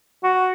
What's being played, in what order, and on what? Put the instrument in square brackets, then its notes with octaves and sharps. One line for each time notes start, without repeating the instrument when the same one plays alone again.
[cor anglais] F#4